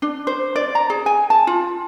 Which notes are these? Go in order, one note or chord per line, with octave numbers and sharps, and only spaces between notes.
D4
C5
D5
A#5
G#4
G#5
A5
F4